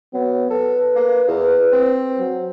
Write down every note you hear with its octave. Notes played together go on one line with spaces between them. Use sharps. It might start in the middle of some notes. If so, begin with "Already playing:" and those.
F#3 B3
A4 B4
A#3
E2
C4
F#3